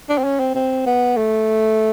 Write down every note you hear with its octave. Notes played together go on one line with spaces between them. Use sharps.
D4
C4
C#4
C4
C4
B3
A3